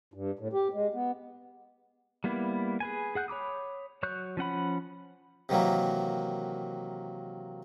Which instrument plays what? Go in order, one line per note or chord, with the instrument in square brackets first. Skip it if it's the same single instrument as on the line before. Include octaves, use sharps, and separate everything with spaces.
[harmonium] G2
A2
G4
G#3
B3
[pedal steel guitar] G3 A#3 B3 E4
G#4 B4 G#5
G#4 F#5 F#6 G6
C#5 B5 D6 D#6
F#3 C#5 C#6 F#6 G6
F3 C#4 F#5 B5
[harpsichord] C3 D#3 E3 F#3 A#3